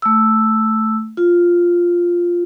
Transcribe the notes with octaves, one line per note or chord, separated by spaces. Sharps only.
A3 E6
F4